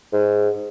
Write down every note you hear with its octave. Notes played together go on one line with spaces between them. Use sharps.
G#2